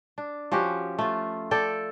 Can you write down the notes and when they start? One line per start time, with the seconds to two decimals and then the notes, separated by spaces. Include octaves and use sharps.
0.18 D4
0.52 F3 C#4 F#4 G4
0.98 A3 F4
1.51 A4 D5 G5